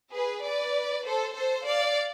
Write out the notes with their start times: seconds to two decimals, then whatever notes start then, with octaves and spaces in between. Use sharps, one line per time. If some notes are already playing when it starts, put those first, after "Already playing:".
0.12 G#4 B4
0.43 B4 D5
1.05 A4 C5
1.36 A4 C5
1.67 D5 F5